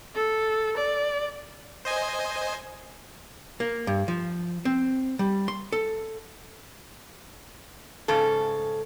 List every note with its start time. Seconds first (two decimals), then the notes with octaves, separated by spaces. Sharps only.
0.15 A4
0.77 D5
1.85 C5 D#5 G#5
3.60 A#3
3.87 G2
4.08 F3
4.65 C4
5.19 G3
5.48 C6
5.72 A4
8.08 G#2 C#3 A4